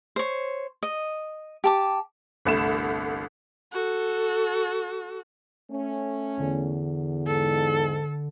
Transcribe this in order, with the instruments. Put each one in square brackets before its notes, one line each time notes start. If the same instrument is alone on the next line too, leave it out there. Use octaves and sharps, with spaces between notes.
[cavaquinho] C5 C#5
D#5
G4 A5 D6
[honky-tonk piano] G1 C2 A3 E7
[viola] F#4 A4
[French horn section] A3 C#4
[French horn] E2 [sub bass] D3
[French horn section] G#2 [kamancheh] A4